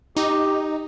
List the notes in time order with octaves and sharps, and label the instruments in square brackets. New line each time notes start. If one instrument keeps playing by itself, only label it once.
[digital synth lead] D#4 [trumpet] G4